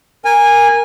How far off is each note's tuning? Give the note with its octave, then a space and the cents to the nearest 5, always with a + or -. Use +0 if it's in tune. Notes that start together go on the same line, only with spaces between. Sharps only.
A#4 +0 G#5 -20